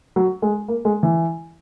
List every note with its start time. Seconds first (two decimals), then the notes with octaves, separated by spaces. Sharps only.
0.16 F#3
0.42 G#3
0.68 A#3
0.85 G#3
1.03 E3